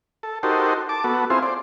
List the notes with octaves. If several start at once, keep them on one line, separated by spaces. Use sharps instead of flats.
A4
D#4 F#4 G4 A4 A#4 C5
A5 D6
B3 F#4 A4
C4 E4 F4 G#4 C5
C5 D5